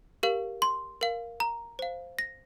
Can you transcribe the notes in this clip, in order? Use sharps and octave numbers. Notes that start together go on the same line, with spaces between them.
G4 A#4 F5
C6
A#4 F5
A#5
C5 F5
A#6